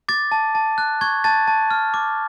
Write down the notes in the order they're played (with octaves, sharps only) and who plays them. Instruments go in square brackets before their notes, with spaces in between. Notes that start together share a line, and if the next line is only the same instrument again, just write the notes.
[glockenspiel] D6 A6
A5
A5
F#6
C#6 G#6
A5 A6
A5
F6
D6